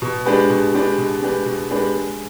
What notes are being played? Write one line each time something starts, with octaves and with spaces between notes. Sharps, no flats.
B2
G#3 D4 G4 B4
B2
G#3 D4 G4 B4
B2
G#3 D4 G4 B4
B2
G#3 D4 G4 B4
G#3